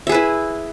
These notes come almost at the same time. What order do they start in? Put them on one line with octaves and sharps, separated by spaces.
E5 G#4 B4 E4